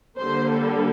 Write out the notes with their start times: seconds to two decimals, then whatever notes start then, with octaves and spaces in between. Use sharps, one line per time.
0.17 D3 G3 A#3 C5
0.50 A4